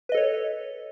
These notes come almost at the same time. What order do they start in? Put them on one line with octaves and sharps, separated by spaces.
B4 D#5 A4 C#5